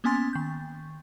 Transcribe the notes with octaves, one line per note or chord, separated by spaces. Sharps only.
A#3 B3 C#4 G#5 C6 A6
D#3 G6